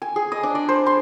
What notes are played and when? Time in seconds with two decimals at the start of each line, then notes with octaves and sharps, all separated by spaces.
0.02 G#5
0.16 G#4
0.32 D#5
0.43 D4
0.55 D5
0.69 C5
0.86 C6